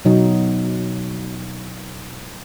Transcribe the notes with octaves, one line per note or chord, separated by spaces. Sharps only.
B2 F#3 D#4